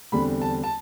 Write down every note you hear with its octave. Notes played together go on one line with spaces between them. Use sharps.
E2 D3 G3 C4 B5
A5
A5